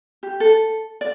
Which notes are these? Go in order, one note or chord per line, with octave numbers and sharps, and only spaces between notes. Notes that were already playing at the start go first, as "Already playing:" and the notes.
G4
A4
D5